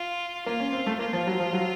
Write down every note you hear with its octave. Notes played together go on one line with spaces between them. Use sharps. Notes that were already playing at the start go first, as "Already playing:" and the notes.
Already playing: F4
A#3 F4
C#4
C4
A3
A#3 F4
F3
F#3
F3
F#3